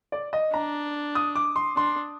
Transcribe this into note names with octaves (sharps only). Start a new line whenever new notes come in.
D5
D#5
D4 A#5
D#6
D6
C6
D4 C6